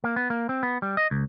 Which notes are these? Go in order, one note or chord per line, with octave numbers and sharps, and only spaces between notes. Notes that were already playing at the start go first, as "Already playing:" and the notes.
A#3
B3
A#3
C4
B3
G3
D#5
C#2